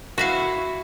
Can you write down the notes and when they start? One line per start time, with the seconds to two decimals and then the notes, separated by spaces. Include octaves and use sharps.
0.18 E4 F#4 E5 F5 C#6